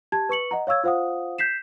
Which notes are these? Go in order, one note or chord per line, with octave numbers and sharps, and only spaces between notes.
G4 A5 G#6
B4 C#6 C#7 F#7
D#5 F#5 A#5
C#5 F5 C#6 E6 G#6
F4 C5 F5 F#5 D#6
G6 B6 C7 E7